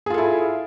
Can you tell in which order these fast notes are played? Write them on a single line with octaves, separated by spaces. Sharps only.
G#4 F4 A4 E4